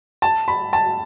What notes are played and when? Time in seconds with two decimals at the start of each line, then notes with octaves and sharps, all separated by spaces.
0.22 A5
0.48 B5
0.73 A5